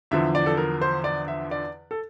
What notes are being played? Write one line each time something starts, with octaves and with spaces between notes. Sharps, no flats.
E2 D3 F3 E5
D5
A4
A#4
C5
D5
E5
D5
A4